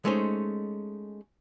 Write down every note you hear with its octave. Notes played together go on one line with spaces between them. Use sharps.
G#3 A3 C#4 D#4 C5